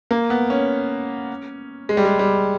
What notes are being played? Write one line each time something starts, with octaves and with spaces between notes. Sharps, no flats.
A#3
B3
C#4
G#3
G3
G#3
G3